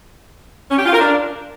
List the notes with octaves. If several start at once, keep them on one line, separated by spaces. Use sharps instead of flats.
C#4
G4
F4
A#4
D4